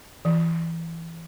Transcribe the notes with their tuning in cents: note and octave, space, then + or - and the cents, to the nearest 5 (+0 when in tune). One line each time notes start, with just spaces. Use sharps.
E3 +5